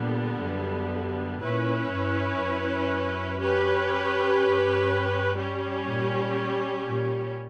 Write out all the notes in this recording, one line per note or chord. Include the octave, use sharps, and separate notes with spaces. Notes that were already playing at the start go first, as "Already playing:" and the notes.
Already playing: A#2 D3 G3 B3
F#2
A#2 C#4 E4 B4
G2
F#2
C#4 G4 B4
G2
G3 C#4 G4
A#2
A#2